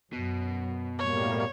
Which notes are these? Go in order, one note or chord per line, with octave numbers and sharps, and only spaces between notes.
F#2 B2
A2 G3 A#3 C#5